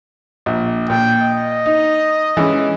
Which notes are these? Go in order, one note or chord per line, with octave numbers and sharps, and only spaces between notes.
A#1
A#2 G5
D#5
D#4
E3 G#3 C#4